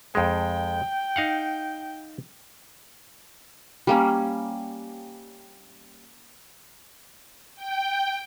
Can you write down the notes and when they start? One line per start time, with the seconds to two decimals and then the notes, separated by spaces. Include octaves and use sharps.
0.15 F2 G#3 G5
1.16 D#4 F5 F#5
3.87 G3 A#3 C#4
7.55 G5